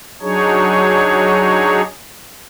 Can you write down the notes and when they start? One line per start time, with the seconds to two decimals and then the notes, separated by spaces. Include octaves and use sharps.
0.21 F#3 D4 D#4 G#4 C#5